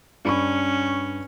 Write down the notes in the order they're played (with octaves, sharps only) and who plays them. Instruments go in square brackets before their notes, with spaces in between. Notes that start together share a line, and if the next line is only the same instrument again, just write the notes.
[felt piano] G2 B5 C#6 [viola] C#4